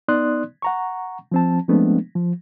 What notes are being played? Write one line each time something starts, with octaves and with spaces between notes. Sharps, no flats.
B3 D#4 D5 C6 D#6 F#6
F#5 A#5 C#6
F3 C4 A5
F3 G#3 A3 B3 C4 D4
F3